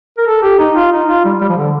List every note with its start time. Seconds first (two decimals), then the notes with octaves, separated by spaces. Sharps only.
0.18 A#4
0.27 A4
0.43 G4
0.59 D#4
0.76 F4
0.92 D#4
1.08 F4
1.25 G3
1.41 G3
1.50 F3
1.58 D3